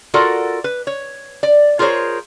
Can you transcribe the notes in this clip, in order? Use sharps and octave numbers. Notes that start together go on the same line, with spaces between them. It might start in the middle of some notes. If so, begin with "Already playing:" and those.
F4 F#4 A4 A#4 D5 F#5
B4
C#5
D5
F4 G#4 A#4 C5 C#5